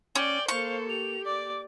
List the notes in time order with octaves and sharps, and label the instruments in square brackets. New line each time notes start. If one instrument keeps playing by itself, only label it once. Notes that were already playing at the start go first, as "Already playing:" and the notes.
[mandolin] C#4 [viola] D5 [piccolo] G5
[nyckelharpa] A#3 A4 [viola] C5 [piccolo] F5 [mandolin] C#6
[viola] G4 [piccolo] F7
[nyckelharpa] D5 [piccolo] D6